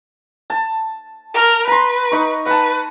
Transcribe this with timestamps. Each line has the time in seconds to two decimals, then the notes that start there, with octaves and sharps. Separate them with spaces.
0.50 A5
1.34 A#4
1.67 B4 A#5 C6
2.12 D#4 C#6
2.46 B4 F#5 A5